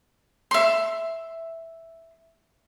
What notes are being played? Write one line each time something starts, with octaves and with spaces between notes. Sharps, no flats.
E5 C6